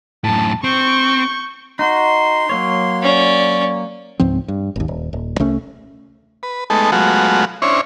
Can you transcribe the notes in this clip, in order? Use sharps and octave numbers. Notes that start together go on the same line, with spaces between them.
F#2 A2 A5
C4 C#6 G6
D#4 F#4 C6
F#3 A#3 C#5
C#4 D5
C#2 G#2 F3 C4
G2
G#1 D#2
D#1
D#1
C2 A3 C#4
B4
G#3 A3 B3 D#4 A4
F#3 G#3 A3 B3 F4 F#4
C#4 D4 E4 C5 C#5